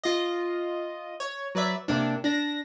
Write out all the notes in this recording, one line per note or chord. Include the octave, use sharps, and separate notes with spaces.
F4 D#5
C#5
F#3 B4 D5 E5
C3 A#3 D4
D4 A#6